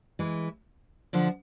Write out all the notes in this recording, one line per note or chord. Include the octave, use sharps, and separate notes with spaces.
E3 G#3
D3 F3